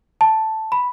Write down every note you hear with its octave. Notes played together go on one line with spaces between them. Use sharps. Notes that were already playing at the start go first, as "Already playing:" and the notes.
A5
B5